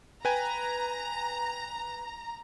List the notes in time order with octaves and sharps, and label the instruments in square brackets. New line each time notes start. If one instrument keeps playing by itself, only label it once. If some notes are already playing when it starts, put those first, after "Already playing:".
[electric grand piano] B4 G5 G#5 [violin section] A#5